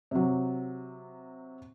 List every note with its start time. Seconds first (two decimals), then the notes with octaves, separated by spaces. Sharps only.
0.11 C3 F#3